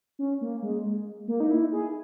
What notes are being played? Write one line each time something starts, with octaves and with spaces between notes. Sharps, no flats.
C#4
A#3
G#3
A#3
D#4
E4
G#4